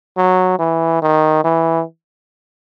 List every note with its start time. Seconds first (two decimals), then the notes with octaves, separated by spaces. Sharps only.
0.17 F#3
0.59 E3
1.02 D#3
1.44 E3